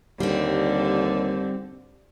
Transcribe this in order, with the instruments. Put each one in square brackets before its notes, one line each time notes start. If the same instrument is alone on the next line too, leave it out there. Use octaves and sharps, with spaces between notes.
[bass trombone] D#2 [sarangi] D3 [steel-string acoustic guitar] G3 C4